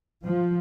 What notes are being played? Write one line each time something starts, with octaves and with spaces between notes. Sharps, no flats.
F3